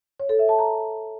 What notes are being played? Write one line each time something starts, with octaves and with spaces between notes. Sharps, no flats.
C#5
A4
E5
A5
A#5